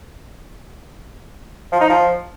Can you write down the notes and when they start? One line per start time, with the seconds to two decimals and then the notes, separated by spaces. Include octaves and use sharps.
1.72 F3
1.81 D#4
1.89 F3